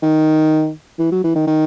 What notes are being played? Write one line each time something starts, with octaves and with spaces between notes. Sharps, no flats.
D#3
E3
F#3
E3
D#3
D#3